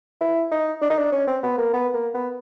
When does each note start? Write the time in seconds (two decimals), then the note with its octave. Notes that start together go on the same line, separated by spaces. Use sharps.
0.21 E4
0.51 D#4
0.82 D4
0.90 D#4
0.98 D4
1.12 C#4
1.27 C4
1.43 B3
1.58 A#3
1.73 B3
1.94 A#3
2.14 B3